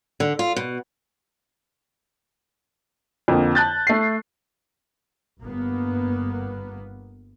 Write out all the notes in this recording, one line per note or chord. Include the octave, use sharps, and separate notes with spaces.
D3
F4
B2
F2 D3 A#3
A5 F#6 G6 A6
A3 C7
G1 A#3 B3